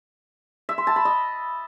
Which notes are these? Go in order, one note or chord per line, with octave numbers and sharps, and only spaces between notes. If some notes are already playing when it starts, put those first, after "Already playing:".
E5
C6
A5
B5
D#5